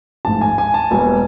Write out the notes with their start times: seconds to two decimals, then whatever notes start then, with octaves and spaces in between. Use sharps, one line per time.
0.25 A1 G#2 F3 A3 A5
0.41 G#5
0.58 G#5
0.74 A5
0.91 E1 E2 B2 G3 A#3 G#5